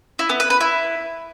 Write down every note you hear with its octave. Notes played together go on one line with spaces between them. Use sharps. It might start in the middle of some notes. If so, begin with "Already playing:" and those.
E4
B3
B4
B4
E4